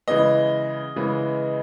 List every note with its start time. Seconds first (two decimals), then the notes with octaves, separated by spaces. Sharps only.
0.08 C#3 E3 G#3 B3 D#5
0.96 C#3 E3 G#3 B3